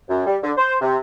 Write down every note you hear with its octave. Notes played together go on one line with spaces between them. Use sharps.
F#2
G3
D3
C5
C3